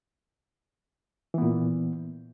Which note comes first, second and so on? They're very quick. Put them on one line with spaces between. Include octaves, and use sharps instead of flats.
E3 B3 A#2